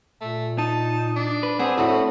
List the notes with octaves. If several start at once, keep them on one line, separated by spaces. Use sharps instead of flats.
A#2 A3
D#4 A5
D4
B4
B3 C4 D4 G#4 C5
A2 A3 B3 F#4 A4